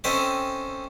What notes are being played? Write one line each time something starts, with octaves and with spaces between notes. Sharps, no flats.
C4 C#4 A4 D#5 E5 G5